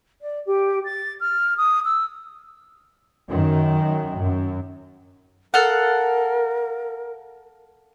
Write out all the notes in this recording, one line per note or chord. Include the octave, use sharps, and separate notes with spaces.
D5
G4
A6
F6
D#6
E6
F#2 D#3
F#2
A4 A#4 F5 F#5